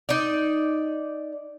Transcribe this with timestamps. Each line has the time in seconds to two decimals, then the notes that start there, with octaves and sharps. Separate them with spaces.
0.09 D#4 D5